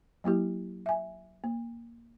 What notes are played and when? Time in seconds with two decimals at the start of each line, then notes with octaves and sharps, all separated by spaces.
0.24 F#3 A#3 E4 G4
0.86 E5 G#5
1.44 A#3